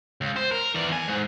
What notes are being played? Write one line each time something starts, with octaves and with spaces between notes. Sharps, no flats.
C#2
C5
A#4
E3 D5
E2 G#5
G#2